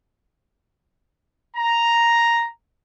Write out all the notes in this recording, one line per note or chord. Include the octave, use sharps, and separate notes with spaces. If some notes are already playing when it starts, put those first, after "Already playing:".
A#5